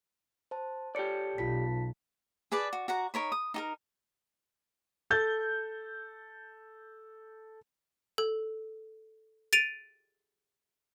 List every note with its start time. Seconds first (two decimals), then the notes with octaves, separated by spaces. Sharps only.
0.51 C5 A5
0.95 G4 A4 C#5 D5 C#7
1.38 B1 F4 A5 B6
2.52 G#4 B4 D5 A5
2.73 F#4
2.88 F#4 F#5 A#5
3.14 D#4 A#4 C#5 B5
3.32 D#6
3.54 D#4 G4 A#4
5.10 A4 G6 A6
8.18 A4
9.53 A6 D7 D#7 F7